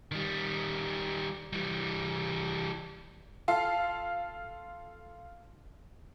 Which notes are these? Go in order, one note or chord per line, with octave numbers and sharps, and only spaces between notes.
D#3 G3
E3 G3
F4 A4 F5